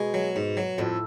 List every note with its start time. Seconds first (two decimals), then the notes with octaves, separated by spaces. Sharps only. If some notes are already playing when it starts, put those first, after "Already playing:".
Already playing: B2 G#3
0.14 F#3
0.36 G#2
0.57 F#3
0.78 F2 A2